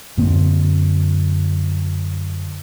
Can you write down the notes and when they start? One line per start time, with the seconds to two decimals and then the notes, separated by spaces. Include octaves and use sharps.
0.17 F#2 D3 A#3 C4